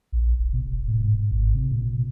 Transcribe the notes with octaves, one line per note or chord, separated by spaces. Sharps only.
A#1
E1
B2
E1
A2
G#2
G#1
C3
A#2